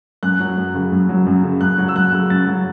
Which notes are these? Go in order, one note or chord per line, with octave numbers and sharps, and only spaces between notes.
F#2 F#6
F#3
F#2
C#3
F#2
F#3
F#2
C#3
F#2 F#6
F#3
E6
F#2 F#6
C#3
F#2 A6
F#3